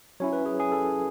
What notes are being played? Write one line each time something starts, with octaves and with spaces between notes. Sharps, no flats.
F#3 C#4 E4 C#5
B4
G#4
G#4
A4